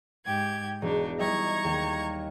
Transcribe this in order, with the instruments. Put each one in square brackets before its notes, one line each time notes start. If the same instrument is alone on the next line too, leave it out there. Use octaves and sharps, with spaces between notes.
[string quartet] G#2 G4 G#6
[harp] E1 [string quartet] D4 D#4
[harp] G3 D#4 E5 [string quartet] A#5 C#6 G#6
[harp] D#2